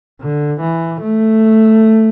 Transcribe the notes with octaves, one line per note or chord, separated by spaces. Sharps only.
D3
E3
A3